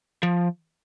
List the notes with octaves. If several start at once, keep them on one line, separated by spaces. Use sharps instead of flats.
F3